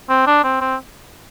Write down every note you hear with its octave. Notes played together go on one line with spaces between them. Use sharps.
C4
D4
C4
C4